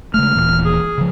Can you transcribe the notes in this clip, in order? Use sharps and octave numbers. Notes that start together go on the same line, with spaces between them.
C#3 G#3 A3 F6
D#1 A#2 E3
G#4
C#3 F3